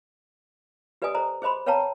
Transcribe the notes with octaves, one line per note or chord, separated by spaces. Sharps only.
G4 B4 D5 D#5 G#5 D#6
A4 C5 D#5 A#5
G#4 C5 D#5 B5 C6
B4 C#5 F5 G5 A5 A#5